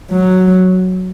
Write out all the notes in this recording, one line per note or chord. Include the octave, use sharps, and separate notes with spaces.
F#3